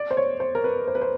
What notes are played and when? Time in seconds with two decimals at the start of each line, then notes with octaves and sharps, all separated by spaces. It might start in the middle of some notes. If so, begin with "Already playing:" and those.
Already playing: D5
0.11 C5
0.17 C#5
0.40 C5
0.55 A#4
0.64 B4
0.87 C5
0.95 B4
1.01 C5